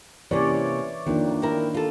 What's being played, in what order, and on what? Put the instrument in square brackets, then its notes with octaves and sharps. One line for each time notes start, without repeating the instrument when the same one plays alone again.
[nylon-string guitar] C3 A#3 C#4 [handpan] E3 C#5 D5
[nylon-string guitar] F2 [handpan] D#3 A#3 D4
[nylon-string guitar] C4 E4 A#4
F4 A4